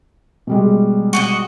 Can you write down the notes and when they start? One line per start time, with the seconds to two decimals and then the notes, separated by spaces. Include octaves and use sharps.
0.47 B2 G3 G#3
1.13 F#4 G4 D#5